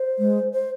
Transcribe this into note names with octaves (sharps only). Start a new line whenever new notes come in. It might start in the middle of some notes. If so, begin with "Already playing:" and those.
Already playing: C5
G#3
C5